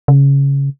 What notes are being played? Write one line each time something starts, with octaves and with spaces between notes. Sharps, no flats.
C#3